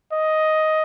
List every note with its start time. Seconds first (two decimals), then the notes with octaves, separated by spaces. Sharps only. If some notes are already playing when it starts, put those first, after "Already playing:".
0.13 D#5